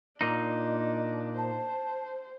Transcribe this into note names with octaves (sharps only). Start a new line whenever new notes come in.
A#2 D4 D#4 D#5
C5 A5